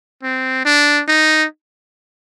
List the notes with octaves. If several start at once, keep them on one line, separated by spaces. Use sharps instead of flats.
C4
D4
D#4